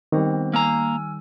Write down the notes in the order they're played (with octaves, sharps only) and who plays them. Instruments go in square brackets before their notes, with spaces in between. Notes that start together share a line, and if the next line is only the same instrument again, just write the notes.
[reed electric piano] D#3 G3 [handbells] B3 C4 C5
[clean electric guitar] A#3 A#5 [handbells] G#5 E6 F6